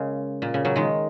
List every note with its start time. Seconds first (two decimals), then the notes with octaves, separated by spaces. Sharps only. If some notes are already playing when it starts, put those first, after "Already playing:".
Already playing: C#3 G#3 A#3
0.42 A#2
0.54 C#3
0.65 C#3 F#3
0.76 D#3 G#3